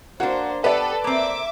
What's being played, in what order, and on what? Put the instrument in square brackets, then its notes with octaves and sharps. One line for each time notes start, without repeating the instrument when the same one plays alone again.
[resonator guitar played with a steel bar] A#3 D4 [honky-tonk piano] F#4 [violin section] C5
[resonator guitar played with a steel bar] B3 G4 [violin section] A4 [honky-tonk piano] B4 D5
[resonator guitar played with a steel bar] A#3 C4 [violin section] E5 D6